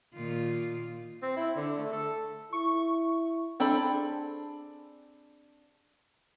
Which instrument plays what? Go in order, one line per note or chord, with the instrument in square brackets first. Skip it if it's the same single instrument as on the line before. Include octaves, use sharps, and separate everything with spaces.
[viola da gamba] A#2 D#3 F4
[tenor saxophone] C4
E4
D3
A3
A4
[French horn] E4 [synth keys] C#6
[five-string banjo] C4 D4 G#4 A4 B5